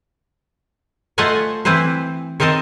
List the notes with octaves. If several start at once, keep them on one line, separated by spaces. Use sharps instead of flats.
A3 F4 C5 D#5 F#5 G#5
E3 C4 E4 B4 C5
D#3 C4 A#4 D#5 A5